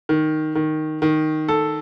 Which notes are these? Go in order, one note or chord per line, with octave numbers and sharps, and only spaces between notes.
D#3
D#3
D#3
A4